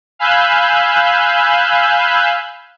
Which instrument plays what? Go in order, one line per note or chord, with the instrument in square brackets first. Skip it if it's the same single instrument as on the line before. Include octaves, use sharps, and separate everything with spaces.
[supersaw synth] F5 G#5 B5 E6 F#6 G6